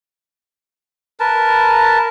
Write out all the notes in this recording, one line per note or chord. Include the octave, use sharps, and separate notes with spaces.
A#4 B4 A5